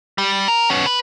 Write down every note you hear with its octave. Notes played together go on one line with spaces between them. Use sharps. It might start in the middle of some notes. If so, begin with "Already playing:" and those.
G3
A#4
B3 C#4
B4